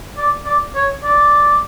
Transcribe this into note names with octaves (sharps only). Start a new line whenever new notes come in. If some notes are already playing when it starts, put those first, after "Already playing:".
D5
D5
C#5
D5